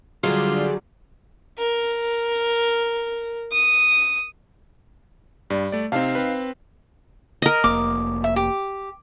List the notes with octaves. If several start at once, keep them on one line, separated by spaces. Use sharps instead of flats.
D3 F#3 G3 F4 G#4 C5 D5
A#4
D#6
G2 G3
A3 D5
C3 C4 D#4 F5
C4 B4
A#4 D#5
F1 A#3 D6
E5
G4